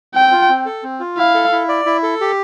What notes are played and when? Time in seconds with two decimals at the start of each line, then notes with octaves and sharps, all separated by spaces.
0.14 C4 G5
0.31 F4
0.49 C4
0.65 A4
0.83 C4
1.00 F4
1.17 E4 F5
1.34 A4
1.52 E4
1.68 D5
1.86 E4
2.03 A4
2.21 G4